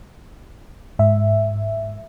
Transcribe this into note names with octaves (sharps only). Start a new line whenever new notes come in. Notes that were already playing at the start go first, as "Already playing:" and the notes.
G#2 E5